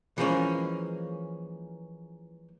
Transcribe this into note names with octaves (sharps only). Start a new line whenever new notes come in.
E3 F3 G#3 A#3 C#4